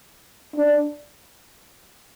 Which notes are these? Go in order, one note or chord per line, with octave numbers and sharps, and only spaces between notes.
D4